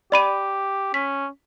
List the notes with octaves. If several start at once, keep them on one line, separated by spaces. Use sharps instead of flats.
G4 D5 B5 D#7
C#4 B6